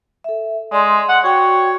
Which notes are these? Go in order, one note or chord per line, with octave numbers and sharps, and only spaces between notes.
A4 E5
G#3 D5 C6
F#5
F#4 C#5 G5